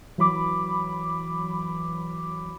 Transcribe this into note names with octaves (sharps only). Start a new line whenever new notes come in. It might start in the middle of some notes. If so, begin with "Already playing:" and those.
E3 F#3 B5 D6